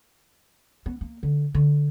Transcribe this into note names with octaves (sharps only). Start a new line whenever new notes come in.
B3
A#3
D3
D3